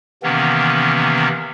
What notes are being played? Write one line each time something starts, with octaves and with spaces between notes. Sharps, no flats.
C3 D#3 E3 A#3 B3 C#4